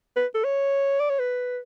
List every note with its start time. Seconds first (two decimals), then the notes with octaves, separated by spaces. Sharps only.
0.16 B4
0.35 A4
0.44 C#5
1.00 D5
1.10 C#5
1.20 B4